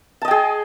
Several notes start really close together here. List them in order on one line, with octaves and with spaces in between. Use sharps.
A5 D#5 G5 G#4